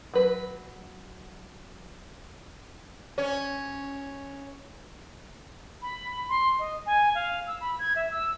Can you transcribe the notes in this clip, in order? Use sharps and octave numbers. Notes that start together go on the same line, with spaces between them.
F#3 B4
C#4
B5
C6
D#5
G#5
F5
E6
B5
G#6
E5
E6